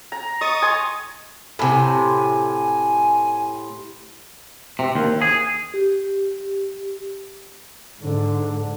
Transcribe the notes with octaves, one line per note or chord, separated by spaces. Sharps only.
A#5
D#5 C#6 D#6 A6
G#5 C6
A2 C3 G#5
C3
D#2
G#4
G4
G#2 D3